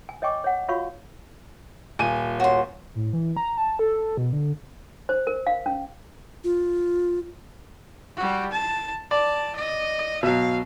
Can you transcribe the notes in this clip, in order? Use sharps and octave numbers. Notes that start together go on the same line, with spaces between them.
G#5
C#5 D#5 G5 G#5 C#6 D6
C#5 F#5
F4 F#4 C#5 F5 B5 C#6
D#1 G#5 D#7
F#4 C#5 C6
A2
E3
A#5
A5
A4
B2
D3
C5
A#4
F5
C#4
F4
G3 F#4
A5
D5 A5
D#5
B2 F#3 F5